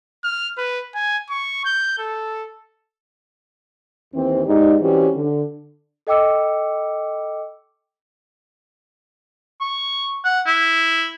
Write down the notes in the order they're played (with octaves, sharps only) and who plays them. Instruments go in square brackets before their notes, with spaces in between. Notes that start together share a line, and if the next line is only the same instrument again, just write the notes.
[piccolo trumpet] F6
B4
G#5
C#6
G6
A4
[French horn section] D#2 E3 C4
G#2 D#4 G4 D5
E3 G3 C4 C#4 F#4
D3
[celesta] A4 D#5 G5 D6 E6 C#7
[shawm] C#6
F#5
E4